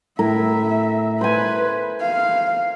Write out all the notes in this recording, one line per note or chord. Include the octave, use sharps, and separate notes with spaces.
A2 A#4 E5
B4 C5 G#5
F5